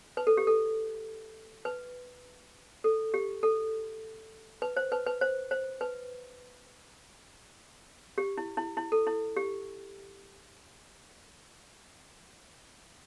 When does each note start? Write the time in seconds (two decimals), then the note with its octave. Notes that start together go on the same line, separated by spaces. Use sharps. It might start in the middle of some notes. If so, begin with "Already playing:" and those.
0.17 B4
0.27 A4
0.37 G4
0.47 A4
1.65 B4
2.84 A4
3.14 G4
3.43 A4
4.62 B4
4.77 C5
4.92 B4
5.06 B4
5.21 C5
5.51 C5
5.81 B4
8.18 G4
8.38 E4
8.57 E4
8.77 E4
8.92 A4
9.07 E4
9.37 G4